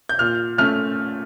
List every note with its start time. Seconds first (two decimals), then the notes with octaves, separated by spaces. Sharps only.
0.09 G6
0.19 A#2 F6
0.58 A3 C#4 F6